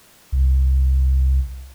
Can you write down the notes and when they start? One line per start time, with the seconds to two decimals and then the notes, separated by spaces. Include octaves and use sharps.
0.32 C2